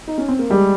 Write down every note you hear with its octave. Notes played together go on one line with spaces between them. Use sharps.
D#4
C#4
C4
A#3
G3 G#3